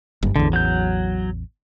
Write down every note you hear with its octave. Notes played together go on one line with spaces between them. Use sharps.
F#1 G2
A1 E2 D3
F#3 G6